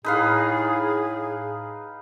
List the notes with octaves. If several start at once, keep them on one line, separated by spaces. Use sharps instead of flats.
A2 D#4 G#4 B4 F5